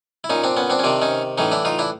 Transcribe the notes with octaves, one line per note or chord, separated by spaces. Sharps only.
E4
A#2 C#4 D#4
C4 D4
B3 C#4
C4 D4
C#4
C3 D#3 C4 D4
C#4 D#4
A2 E3 C#4 D#4
D4 E4
D#4 F4
D4 E4